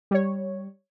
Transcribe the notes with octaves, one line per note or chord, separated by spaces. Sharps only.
G3 C#5